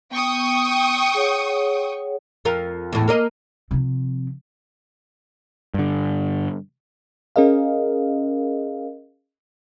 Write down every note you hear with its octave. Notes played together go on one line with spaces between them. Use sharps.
B3 G5 C#6 D#6
G#4 C#5 F#5
F2 F4 A#4
E2 A2
A#3 A#4 D#5
C3 F3
G2 D3
C#4 G#4 A#4 D#5 F5